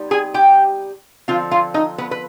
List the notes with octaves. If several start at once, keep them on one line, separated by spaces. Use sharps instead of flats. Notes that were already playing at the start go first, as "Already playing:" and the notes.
Already playing: C3 G3 B3 D#4
G#4 G#5
G4 G5
D3 F3 C4 F4 F5
F4 F5
D#4 D#5
B3 B4
B4